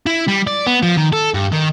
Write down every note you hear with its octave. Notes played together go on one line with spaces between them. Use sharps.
E4
G3
D5
B3
F3
D#3
A4
G2
D#3